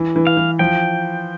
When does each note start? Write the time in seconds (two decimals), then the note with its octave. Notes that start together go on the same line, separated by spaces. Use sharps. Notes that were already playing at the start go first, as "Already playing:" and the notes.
Already playing: E3
0.16 E3
0.27 F5
0.37 E3
0.59 F3 G5